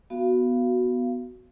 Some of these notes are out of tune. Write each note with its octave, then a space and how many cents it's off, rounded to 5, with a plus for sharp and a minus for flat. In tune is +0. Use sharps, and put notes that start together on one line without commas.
B3 +0 F#4 +0 F5 -20